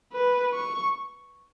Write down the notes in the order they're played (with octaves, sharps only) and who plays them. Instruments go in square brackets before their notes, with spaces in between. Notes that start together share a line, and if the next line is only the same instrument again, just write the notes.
[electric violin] B4
C#6